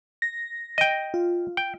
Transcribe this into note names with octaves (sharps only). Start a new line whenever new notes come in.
A#6
D#5 G5
F4
G5